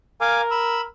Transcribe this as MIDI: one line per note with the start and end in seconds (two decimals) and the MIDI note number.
0.21 0.86 70
0.21 0.41 77
0.21 0.41 80
0.21 0.41 86
0.51 0.81 83
0.51 0.81 88